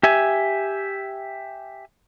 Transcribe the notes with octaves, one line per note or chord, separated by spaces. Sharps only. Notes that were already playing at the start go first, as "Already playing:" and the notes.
G4 E5 G#5